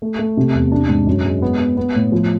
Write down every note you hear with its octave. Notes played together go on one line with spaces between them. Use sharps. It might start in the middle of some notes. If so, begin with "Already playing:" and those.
A3
A3
C3
E2
D4
G#2
F#2
G#3
B3
B3
B3
A2
F3